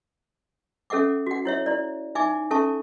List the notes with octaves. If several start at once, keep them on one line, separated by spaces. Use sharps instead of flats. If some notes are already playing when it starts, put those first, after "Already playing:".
C#4 A4 E5 F#5 D6
F#4 F#5
E4 C#5 E5
E4 D5
D#4 E5 G#5 D6
C#4 A4 E5 A5 C#6